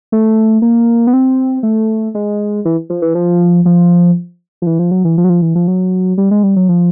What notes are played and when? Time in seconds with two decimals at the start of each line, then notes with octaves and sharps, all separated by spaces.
0.12 A3
0.62 A#3
1.07 B3
1.13 C4
1.63 A3
2.15 G#3
2.65 E3
2.90 F3
3.02 E3
3.15 F3
3.65 F3
4.62 F3
4.67 E3
4.79 F3
4.91 F#3
5.05 E3
5.18 F3
5.24 F#3
5.29 F3
5.42 E3
5.55 F3
5.68 F#3
6.18 G3
6.31 G#3
6.43 G3
6.56 F#3
6.69 F3